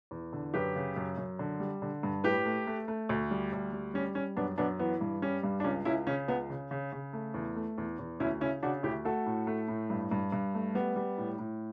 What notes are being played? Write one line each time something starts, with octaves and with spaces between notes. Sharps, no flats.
E2
D3
F#2 G4 B4
C#3
F#2
F#2
D3
G3
D3
G2
A2 G4 B4
A3
A3
A3
D2
G3
D2
G3
G3 C#4
G3 C#4
F#2 B3 D4
F#2 B3 D4
E3 B3
G2
G3 C#4
G2
D4
C#2 C#4
C#2 C#4 E4
C#3 C#4
C#2 B3
C#3
C#3
C#3
A3
E2
A3
E2
E2
D2 C#4 E4
C#3 C#4 E4
C#3 D4 F#4
D2 E4 G4
A3 F#4 A4
A2
A3
A2
G2
G2
G2
A3
G3 B3
G3
A2
A2